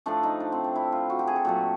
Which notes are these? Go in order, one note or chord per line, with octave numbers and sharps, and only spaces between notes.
A2 F3 A3 D4
D#4
D4
C4
D4
E4
F4
F#4
G4
G#4
A4
A#2 F#3 A3 G4